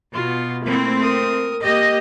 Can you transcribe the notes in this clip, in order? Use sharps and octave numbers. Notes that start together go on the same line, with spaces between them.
B2 F4
A3 A#3 C4 E4
A#4 D#6
A#3 G4 D#5